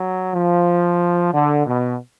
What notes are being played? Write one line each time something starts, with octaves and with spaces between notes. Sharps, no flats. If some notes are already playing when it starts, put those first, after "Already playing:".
Already playing: F#3
F3
D3
B2